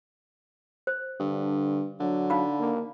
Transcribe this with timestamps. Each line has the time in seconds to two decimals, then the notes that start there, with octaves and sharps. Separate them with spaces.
0.87 C5
1.20 G2 D3
2.00 D3 F#3
2.30 D#4 F5 B5
2.60 A#3